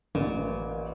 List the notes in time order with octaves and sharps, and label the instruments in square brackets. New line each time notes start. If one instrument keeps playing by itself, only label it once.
[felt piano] A1 [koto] A#2